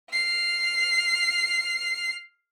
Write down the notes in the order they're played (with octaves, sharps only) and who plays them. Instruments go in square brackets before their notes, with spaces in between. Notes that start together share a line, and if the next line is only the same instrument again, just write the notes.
[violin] F6 C7